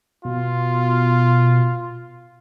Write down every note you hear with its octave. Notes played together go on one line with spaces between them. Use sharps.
B2 F4